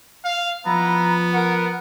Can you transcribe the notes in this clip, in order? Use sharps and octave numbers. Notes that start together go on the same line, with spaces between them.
F5
F3 B3 E4 A#5
A#4 F#5